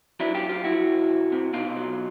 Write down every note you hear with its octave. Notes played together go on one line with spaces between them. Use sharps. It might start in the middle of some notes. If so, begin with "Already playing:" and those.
F#3 D4 E4
F4 G4
F#2
F4 G4
F2 E4 F#4
F2
C2
C3
B2 D#4 F4
F#3